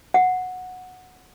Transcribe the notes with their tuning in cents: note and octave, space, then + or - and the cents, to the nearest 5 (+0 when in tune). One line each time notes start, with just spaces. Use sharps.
F#5 -10